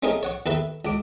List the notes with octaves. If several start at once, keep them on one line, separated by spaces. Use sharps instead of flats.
A3 C4 C#4 D#4 G#4 A#4
C#5 F#5 C#6
D#2 A4 B4 E5 B5
C#2 D6